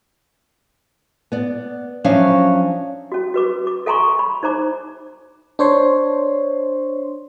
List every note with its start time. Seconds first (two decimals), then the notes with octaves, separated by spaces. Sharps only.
1.32 B3 D5
2.04 F3 F#3 C#4 D4 E5 F5
3.12 C#4 F#4
3.34 F#4 B4 D6
3.67 D6
3.86 A4 F5 G#5 A#5 C6 C#6
4.19 B5
4.43 D#4 C5 A#5 D6
5.59 D4 C5 C#5 C6